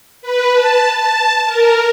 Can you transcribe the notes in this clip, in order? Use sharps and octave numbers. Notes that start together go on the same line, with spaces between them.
B4
A5
A5
A#4